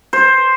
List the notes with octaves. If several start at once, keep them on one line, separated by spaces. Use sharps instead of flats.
C5